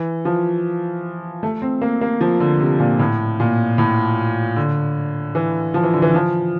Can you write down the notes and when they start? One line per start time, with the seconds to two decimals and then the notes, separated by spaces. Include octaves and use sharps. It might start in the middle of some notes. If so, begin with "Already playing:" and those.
Already playing: E3
0.25 F3
1.43 A3
1.62 C4
1.81 A#3
2.01 A#3
2.21 F3
2.40 D3
2.60 C3
2.80 A#2
2.99 A2
3.40 A#2
3.78 A2
4.56 D3
5.35 E3
5.74 F3
5.83 E3
5.94 D3
6.02 E3
6.14 F3